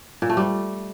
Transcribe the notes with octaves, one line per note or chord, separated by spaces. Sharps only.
A#2
A3
G3